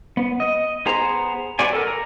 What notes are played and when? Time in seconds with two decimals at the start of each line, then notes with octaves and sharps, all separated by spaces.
0.17 B3
0.40 D#5
0.86 B3 G#4 C5 A#5
1.59 B3 F#4 D5 G#5
1.73 A4 A#4
1.87 A#5